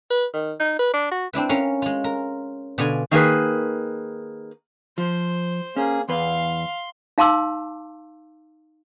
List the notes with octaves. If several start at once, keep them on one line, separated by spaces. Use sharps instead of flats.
B4
D#3
D#4
B4
D4
F#4
C4 D4 E4 B4
C#4 A#4 F5
G#3 F4
A#4
B2 D3 F4 D5 G#5
D#3 A#3 G#4 B4
F3 C5
A#3 C#4 G#4
E2 B4 F5 C6
D#4 F5 A5 C6 D6 E6